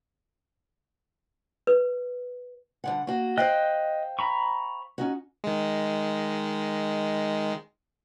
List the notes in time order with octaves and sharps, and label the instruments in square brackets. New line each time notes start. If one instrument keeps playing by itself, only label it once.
[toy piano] B4
[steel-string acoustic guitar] G2 D3 F#5
A#3 F#4
[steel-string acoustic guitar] C5 F5 G5 [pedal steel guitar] D#5 F#6
[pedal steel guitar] A#5 B5 C#6
[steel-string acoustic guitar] C#4 D#4 F#4
[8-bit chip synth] D#3 G#3